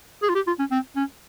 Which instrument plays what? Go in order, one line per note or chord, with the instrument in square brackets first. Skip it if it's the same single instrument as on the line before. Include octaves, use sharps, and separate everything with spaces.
[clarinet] G#4
F4
G4
F4
C#4
C4
C#4